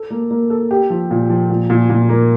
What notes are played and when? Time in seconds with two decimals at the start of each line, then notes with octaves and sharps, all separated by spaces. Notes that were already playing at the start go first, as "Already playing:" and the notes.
Already playing: A4
0.10 A#3
0.31 A#3
0.50 A4
0.71 G4
0.90 F3
1.10 A#2
1.30 F3
1.50 A#2
1.70 A#2
1.90 A#2
2.09 A#3